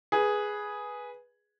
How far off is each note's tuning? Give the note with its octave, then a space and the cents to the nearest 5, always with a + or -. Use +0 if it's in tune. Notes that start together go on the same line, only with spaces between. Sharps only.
G#4 +0 B4 -10